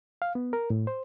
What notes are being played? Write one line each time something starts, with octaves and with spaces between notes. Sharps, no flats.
F5
B3
A#4
A2
C5